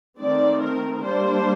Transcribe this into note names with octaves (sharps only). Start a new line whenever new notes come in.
D#3 A3 C4 D5
A#4
G3 A#3 D4 C5